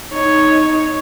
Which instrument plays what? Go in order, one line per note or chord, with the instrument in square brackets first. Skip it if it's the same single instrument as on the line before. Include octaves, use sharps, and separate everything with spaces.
[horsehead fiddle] D#4 [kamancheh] C#5